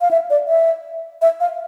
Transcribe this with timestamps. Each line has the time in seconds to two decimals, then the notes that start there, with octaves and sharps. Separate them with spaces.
0.01 F5
0.11 E5
0.30 D5
0.48 E5
1.22 E5
1.40 F5